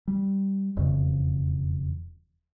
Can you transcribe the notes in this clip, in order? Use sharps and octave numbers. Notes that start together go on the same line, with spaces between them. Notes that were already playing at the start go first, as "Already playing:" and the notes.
G3
E1 F2 C#3